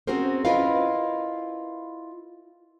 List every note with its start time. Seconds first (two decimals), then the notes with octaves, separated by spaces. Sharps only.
0.07 C4 C#4 F#4 G#4 A#4 C5
0.45 E4 F4 A#4 B4 D#5 F5